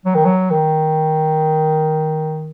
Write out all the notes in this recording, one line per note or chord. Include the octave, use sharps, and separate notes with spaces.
F#3
D#3
F#3
D#3